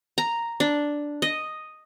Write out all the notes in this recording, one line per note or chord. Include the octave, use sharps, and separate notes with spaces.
A#5
D4
D#5